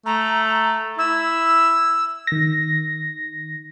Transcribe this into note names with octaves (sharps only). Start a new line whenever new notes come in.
A3 A#5
E4 E6
D#3 A#6